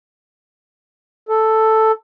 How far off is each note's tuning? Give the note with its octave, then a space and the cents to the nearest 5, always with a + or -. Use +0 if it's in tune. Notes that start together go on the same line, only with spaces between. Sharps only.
A4 +0